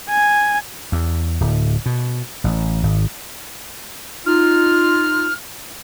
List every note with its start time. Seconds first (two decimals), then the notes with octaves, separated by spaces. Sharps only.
0.10 G#5
0.92 E2
1.41 D1
1.86 B2
2.44 A1
2.83 G#1
4.26 D#4 F4 F6